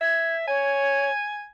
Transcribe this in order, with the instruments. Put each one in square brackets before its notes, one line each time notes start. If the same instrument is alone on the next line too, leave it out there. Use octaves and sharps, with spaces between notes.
[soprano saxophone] E5 [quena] G#6
[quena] C#5 [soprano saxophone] G#5